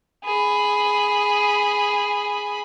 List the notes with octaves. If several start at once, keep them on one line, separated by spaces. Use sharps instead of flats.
G#4 B5